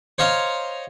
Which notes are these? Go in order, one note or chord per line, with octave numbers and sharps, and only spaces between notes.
C5 C#5 D#5 F5 A#5 C6